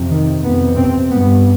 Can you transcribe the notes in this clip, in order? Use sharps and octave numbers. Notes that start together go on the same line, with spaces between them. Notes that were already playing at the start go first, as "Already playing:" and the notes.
Already playing: F2 C3
D#3
F2 C3 B3
C4
G2 B3